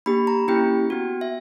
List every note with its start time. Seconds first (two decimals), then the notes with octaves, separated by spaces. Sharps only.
0.06 A#3 D4 G4 B5
0.27 A#5
0.48 A#3 C#4 E4 G4 G5
0.90 B3 F#4
1.21 E5